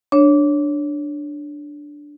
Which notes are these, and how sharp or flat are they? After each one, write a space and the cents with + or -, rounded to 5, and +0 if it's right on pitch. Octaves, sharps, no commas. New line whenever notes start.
D4 +0 C#5 +0